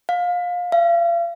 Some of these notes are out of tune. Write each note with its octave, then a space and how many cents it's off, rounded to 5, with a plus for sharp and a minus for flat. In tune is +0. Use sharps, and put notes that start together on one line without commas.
F5 +25
F5 -40